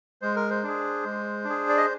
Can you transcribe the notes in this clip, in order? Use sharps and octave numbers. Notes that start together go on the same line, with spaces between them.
G#3 C5
A#4
C5
D4 G#4
G#3
D4
G#4
D5
D#5